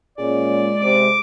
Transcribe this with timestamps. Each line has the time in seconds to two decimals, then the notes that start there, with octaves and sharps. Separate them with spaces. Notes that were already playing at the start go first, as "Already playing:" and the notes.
0.18 A#2 G#3 C#4 D5
0.82 C3 D6